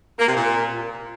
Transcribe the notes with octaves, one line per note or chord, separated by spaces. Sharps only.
A#3
C3
A#2